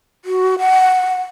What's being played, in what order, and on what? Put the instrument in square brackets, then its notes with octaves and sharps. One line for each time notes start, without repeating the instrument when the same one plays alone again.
[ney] F#4
F#5